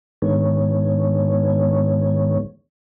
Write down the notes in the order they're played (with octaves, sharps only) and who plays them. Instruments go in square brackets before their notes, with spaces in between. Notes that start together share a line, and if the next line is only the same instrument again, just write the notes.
[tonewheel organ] G#2 D3 D#3 G#3 B3 C#5